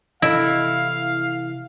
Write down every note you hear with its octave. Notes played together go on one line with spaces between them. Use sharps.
C3 E3 E4 A4 D#5 F5 D7